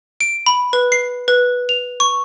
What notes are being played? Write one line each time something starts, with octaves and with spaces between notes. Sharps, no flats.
D7
B5
B4
C7
B4
F7
C#6